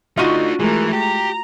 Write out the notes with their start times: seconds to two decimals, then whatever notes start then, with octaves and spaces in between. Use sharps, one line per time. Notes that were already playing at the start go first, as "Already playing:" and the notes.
0.17 A3 D4 D#4 F4 F#4 C#6 D#7
0.60 E3 G#3 A3 A#4
0.92 G4 A#5